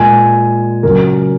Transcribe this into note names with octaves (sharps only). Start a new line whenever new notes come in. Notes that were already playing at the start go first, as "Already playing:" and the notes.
Already playing: A#2 G#3 G#5
C#3 F#3 A#4